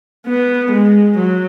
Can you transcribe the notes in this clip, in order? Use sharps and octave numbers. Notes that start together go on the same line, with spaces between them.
B3
G#3
F#3